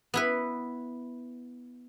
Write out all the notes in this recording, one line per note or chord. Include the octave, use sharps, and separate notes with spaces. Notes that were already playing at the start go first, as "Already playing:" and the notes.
B3 E4 B4